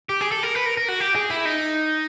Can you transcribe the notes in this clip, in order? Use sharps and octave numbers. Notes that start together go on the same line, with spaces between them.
G4
G#4
A4
A#4
B4
A#4
A#4
F#4
G4
G#4
E4
D#4